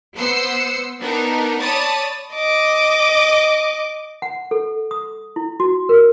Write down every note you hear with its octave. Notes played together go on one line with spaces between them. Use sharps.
B3 C5 E6 C7 C#7
B3 D4 D#4 A#4
C#5 D5 A5 B5 D#6 A6
D#5 D6
F#5
A4
D#6
E4
F#4
A#4